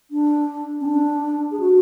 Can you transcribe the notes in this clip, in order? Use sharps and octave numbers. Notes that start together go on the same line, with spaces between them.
D4
C#4
D4
G#4
F#4